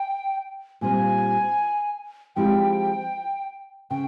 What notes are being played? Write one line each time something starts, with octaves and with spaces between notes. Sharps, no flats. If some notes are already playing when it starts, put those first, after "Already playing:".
Already playing: G5
A#2 G3 C4 F4 G#5
F3 G#3 C4 E4 G4 G5
C#3 G5